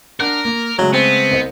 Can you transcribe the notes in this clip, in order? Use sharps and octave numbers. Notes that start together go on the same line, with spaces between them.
D4 A#4 F#5 F#6
A#3
C#3 F#3 G#3 A3
B3 C4
C2 C5 D#5